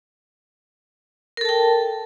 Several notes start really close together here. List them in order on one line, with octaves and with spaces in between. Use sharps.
A#4 A4 A5 G5